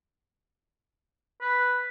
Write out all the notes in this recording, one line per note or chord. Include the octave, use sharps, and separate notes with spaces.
B4